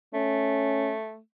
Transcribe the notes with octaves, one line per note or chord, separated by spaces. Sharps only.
A3 C#4